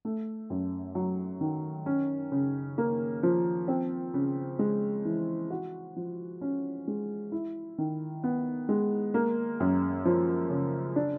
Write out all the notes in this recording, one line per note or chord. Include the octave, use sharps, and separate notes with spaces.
A3
F#2
F#3
D#3
C#4
C#3
A#3
F3
C4
C#3
G#3
E3
F#4
F3
C#4
G#3
E4
D#3
B3
G#3
A#3
F#2
F3
C#3
D4